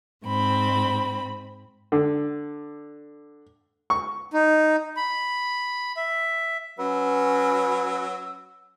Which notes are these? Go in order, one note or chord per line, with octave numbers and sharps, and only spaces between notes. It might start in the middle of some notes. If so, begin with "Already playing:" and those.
G#2 C4 B5
D3
C#6
D#4
B5
E5
F#3 C#4 B4 E6